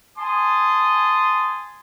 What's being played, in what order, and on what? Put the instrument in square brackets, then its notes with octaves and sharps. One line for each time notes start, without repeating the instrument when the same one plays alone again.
[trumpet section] G#5 A5 C6 D#6